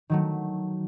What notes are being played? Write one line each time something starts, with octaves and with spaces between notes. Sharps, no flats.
D#3 F#3 A3